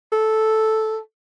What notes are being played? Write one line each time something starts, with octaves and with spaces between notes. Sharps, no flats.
A4